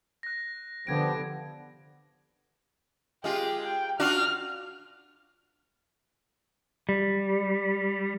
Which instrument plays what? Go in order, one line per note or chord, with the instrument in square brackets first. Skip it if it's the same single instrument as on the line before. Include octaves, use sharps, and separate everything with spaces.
[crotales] F#6 A#6
[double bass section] D3 [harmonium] F3 B3 G4 [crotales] G#6 D7
[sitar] G#3 F4 [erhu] G4
[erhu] G5
[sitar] D4 F4 F#4 [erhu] F6
[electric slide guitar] G3